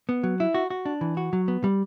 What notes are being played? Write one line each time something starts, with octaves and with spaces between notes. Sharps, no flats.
B3
F#3
E4
F#4
F#4
D4
E3
F#4
F#3
B3
G3